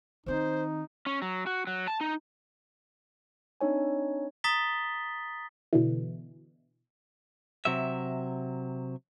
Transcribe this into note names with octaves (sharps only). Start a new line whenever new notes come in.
D#3 C4 D#4 C5
C#4
F#3
F#4
F#3
A5
D#4
C4 D4 D#4 C#5 G#5
A#5 D#6 A6 B6 G7
B2 D3 E3
C3 F#3 E5